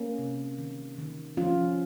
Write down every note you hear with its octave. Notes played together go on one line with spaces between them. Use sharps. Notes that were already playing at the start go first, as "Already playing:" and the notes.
Already playing: A#3 C#4
C3
D#3
D#3
F3 C#4 F4